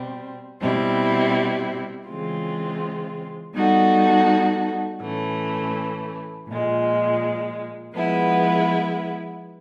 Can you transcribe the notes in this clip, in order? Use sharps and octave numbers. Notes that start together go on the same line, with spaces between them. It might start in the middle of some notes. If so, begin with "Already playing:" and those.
Already playing: B2 G3 C4
B2 G3 C4 E4
C#3 E3 G#3 C4 F4
G3 B3 D#4 F#4 A4
A2 E3 A3 C#4
A#2 F3 G#3
F3 G#3 B3 E4